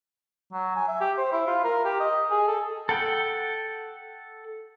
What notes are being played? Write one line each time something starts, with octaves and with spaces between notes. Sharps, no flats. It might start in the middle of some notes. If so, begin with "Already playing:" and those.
F#3
G#5
E5
G4
C5
E4
F4
A#4
G4
D#5
G#4
A4
A4 F#5 G5